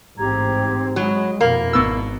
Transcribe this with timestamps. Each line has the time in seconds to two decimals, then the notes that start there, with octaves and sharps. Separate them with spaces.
0.17 A1 G#2 C4 G4 A#5 G#6
0.96 F#3 G#3 B5
1.41 F2 B2 A#3 E4
1.73 G#1 B2 E6